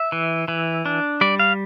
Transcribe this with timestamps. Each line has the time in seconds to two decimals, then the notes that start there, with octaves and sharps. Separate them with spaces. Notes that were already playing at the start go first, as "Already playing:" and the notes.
Already playing: E5
0.12 E3
0.48 E3
0.86 D4
1.21 G3 D5
1.39 F5